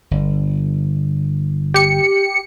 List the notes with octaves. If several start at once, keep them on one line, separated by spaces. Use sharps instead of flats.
G1
G4 C#7